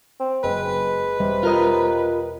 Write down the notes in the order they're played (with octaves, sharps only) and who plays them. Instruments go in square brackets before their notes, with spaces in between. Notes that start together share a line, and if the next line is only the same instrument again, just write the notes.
[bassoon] C4
[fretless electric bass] F#1 F#2 [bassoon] G#3 [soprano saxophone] B4
[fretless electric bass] E1 G3 [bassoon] C3
[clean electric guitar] F4 A#4 D#5